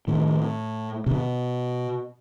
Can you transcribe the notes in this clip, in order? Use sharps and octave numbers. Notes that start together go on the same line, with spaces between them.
A2 D#3
B2 D3